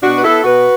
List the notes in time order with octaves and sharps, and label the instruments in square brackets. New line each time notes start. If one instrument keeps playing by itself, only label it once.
[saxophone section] B2 D4 F#4
B4
B3 E4 A4
B2 F#4 B4